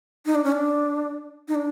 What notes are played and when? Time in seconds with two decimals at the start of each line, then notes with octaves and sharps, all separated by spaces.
0.26 D#4
0.35 D4
0.44 C#4
0.52 D4
1.48 D#4
1.55 D4